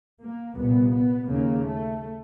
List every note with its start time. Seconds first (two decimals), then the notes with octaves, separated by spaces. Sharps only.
0.20 A#3
0.55 C2 A#2 B3
0.92 B3
1.28 D#2 C#3 A#3
1.66 A3